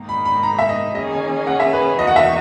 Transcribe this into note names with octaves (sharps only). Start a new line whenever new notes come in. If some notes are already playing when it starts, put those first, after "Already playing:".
Already playing: G#2 D#3 A#3 D#4
B5
B5
A#5
E5
D#5
D#3 A#3 C#4 G#4 D#5
G#5
F#5
E5
B4
E2 D#3 A#3 D#4 F#4 D#5
F#5
E5